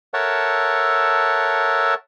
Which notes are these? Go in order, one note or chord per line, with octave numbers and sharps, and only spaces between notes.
A4 A#4 C#5 E5 F#5 A5